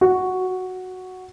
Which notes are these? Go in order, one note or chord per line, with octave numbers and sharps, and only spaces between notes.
F#4